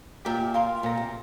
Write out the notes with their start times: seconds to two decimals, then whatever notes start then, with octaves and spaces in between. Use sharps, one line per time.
0.25 A#2 G4 A#4 E5 G5
0.54 F4 A#4 F5 C6
0.83 A#2 A4 C5 F5 A#5
0.97 C3